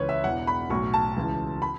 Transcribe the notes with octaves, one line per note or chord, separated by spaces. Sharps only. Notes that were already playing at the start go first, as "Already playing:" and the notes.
Already playing: C#2 C#3 E3 B4 C#5
E5
E1 E2 E3 F#5
B5
B1 A2 F#3 C#6
A5
C#2 C#3 E3
B5